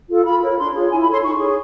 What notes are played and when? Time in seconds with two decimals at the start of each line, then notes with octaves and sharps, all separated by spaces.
0.09 F4 A4
0.26 F4 B5
0.41 A#4 C#5
0.58 D4 C6
0.75 F4 G#4 C#5
0.90 E4 G#5
1.02 B5
1.07 A4 C#5 C6
1.23 D#4 C#6
1.39 G#4 C#5